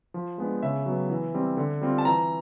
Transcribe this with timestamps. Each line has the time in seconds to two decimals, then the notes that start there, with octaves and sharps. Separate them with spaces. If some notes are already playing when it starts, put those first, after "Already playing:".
0.14 F3
0.38 G#3 B3 D4
0.63 C#3 E5
0.86 F#3 B3
1.10 E3
1.34 G3 C4
1.57 D3
1.81 G3 C4 F4
1.98 A5
2.05 E3 A#5